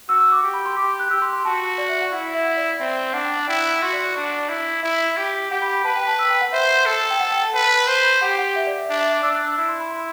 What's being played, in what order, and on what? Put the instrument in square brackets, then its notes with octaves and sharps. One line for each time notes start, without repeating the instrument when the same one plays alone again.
[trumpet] F#4 [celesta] E6
[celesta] E6
D6
[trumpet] G4
[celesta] B5
C6
[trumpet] G4 [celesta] D6
[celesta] F#6
[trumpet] G4 [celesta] E6
[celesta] C6
C6
[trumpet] F#4 [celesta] A5
[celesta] D5
E5
F#5
[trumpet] E4 [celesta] F#5
[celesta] E5
E5
D5
D5
[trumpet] C4 [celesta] E5
[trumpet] D4 [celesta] F#5
[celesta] G5
F#5
[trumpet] E4 [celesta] G5
[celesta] F#6
E6
[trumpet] F#4 [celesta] C6
[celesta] D5
D5
[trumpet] D4 [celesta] D5
[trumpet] E4
[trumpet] E4 [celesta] E5
[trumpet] G4
[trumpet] G4 [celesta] F#5
[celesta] B5
B5
[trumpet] B4 [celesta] A5
[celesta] G5
A5
E6
G5
F#5
[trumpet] C5 [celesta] E5
[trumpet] A4
[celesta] G5
F#5
G5
A5
[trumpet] B4 [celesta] A5
[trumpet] C5
[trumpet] G4 [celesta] F#5
[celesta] F#5
E5
D5
E5
[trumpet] D4 [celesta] E5
[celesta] E5
D6
[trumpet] D4 [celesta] E6
[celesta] F#6
E6
[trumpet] E4 [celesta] E6
[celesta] C6
B5
C6